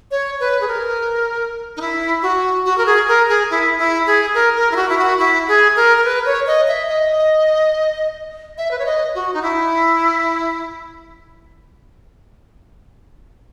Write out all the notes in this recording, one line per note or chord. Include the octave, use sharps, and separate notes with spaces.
C#5
B4
G#4
A#4
D#4
E4
F#4
F#4
A#4
G#4
A#4
G#4
E4
E4
G#4
A#4
A#4
E4
F#4
E4
F#4
E4
G#4
A#4
A#4
B4
C#5
D#5
E5
D#5
E5
B4
C#5
D#5
F#4
D#4
E4